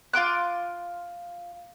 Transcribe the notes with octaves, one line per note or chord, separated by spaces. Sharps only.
F4 C6 D6 F#6